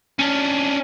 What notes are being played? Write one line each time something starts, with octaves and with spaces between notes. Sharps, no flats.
C#4 D4